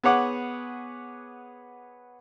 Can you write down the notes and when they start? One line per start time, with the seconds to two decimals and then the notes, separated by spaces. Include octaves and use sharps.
0.04 B3 G#4 C#5 F#5 D6